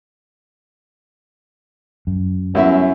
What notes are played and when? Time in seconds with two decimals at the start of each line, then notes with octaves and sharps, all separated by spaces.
2.07 F#2
2.55 F#2 G3 B3 C#4 E4 E5